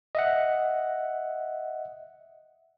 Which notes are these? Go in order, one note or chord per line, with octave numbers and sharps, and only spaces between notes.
D#5 E5 F#5